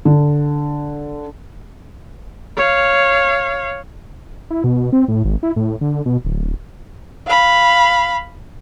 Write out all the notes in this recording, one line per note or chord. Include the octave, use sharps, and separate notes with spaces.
D3
C#5 F5
E4
B2
C4
A2
G#1
E4
A2
D3
B2
D1
F5 B5